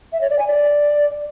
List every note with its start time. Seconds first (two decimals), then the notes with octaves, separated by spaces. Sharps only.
0.12 E5
0.21 C#5
0.30 D5
0.39 G#5
0.47 D5